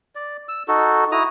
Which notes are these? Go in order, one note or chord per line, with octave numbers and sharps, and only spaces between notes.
D5
E6
D#4 F#4 A4
E4 F#4 A#5 D#6